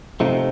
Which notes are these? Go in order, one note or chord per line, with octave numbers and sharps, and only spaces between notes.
C3 F3 A3 D#4